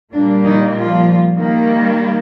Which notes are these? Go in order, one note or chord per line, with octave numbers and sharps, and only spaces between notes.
A#2 G3 A#3 D4
D#3 D#4
F3 F4
D#3 G3 A#3